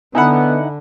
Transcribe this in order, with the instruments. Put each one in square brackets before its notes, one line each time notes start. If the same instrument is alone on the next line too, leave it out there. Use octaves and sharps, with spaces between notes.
[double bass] D3 [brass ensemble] B3 [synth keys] D#4 E4 F#5 [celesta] G#5 B5